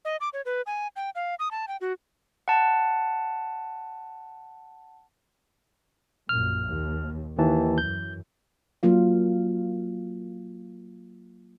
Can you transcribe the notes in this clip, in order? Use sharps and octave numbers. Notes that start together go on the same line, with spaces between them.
D#5
D6
C#5
B4
G#5
G5
F5
D#6
A5
G5
F#4
F#5 A5
A#1 F#2 A#2 F6
D#2
D#2 D#3 E3 A5
F#2 E3 G6
F#3 A#3 F4 F5